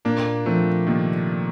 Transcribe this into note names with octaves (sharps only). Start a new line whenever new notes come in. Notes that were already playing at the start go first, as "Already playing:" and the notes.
A#2 A#3 D4
F3 A3 C4
C3 D#3 A#3